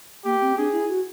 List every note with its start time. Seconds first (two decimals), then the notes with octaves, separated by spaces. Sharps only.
0.25 A#3 G4
0.41 C4
0.58 D4 G#4
0.73 E4
0.89 F#4